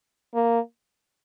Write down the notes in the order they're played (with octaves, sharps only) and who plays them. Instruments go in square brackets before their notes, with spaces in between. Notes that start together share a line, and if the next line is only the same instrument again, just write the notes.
[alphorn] A#3